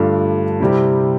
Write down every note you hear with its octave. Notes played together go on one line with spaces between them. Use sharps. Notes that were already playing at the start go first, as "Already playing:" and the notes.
Already playing: G2 D3 A3 D4 F4
C3 G3 C4 E4